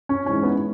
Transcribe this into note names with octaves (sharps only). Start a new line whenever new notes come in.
C#4
G#2 E3 C#4
B3